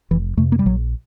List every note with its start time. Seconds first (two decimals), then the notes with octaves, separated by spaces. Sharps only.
0.11 F1 E3
0.37 F2 C3 A3
0.52 A#3
0.59 G3
0.66 A#1 F#3